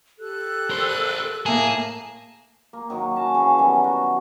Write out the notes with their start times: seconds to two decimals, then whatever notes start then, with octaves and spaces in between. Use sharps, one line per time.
0.19 G4 A4 F#6
0.70 A#4 C5
1.46 A2 A#3 G#4 E5 A5
2.73 A#3
2.90 D#3 F#3 A#3
3.16 C#4 F#4 A5
3.34 C#3 E3
3.59 B2 D#3 F#3 G3
3.84 F#4